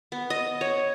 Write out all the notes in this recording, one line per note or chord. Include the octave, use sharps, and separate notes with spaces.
B3
D#5
C#5